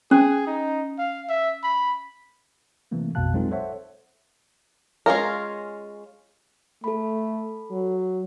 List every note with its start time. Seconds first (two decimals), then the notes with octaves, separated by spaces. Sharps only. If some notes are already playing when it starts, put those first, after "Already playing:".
0.11 C#4 G#4
0.47 D#4
0.99 F5
1.29 E5
1.63 B5
2.91 C3 E3 A3 A#3 C4
3.15 A#1 F2 B2 F5 A5 F#6
3.33 F#3 G#3 C4 D#4 F4 A#4
3.51 A4 C5 C#5 E5 F#5
5.06 G#3 C#4 F4 A#4
6.84 A3 A4 B5
7.71 F#3